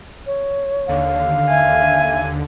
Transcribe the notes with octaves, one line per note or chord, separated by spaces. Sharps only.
C#5
D#2 D3 F5
E5 G#5